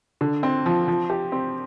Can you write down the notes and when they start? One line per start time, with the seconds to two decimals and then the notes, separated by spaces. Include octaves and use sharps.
0.21 D3
0.43 C4
0.66 F3
0.88 F3
1.10 G4
1.32 C4